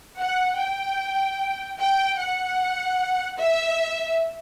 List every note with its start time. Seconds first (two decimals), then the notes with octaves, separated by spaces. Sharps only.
0.19 F#5
0.59 G5
1.79 G5
2.19 F#5
3.39 E5